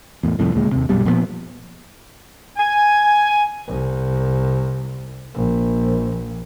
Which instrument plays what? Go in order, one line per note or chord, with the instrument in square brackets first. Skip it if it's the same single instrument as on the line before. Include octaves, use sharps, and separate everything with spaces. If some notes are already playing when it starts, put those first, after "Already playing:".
[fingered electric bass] E2 A2
C2 F2 A2
D#1 D2 A#2 G#3
D#2 C3
A#1 F#2 B2 G3
A#2 F3 G#3 B3
[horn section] G#5
[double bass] C2
A#1